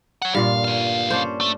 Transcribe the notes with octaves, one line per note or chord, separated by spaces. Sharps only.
C#5 F#5
G2 A#2 F4 F5
D2 F5
C#4 D4 C5
A3